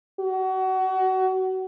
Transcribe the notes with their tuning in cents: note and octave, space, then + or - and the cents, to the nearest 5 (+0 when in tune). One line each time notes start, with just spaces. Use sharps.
F#4 +30